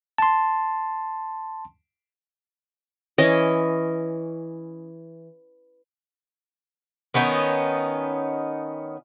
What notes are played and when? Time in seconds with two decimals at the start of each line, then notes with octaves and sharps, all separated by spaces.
0.18 A5 C6
3.18 E3 C#4 D#5
7.14 D#3 B3 C#4 D#4